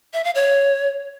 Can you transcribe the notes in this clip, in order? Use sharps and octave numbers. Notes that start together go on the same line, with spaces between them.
E5
F5
C#5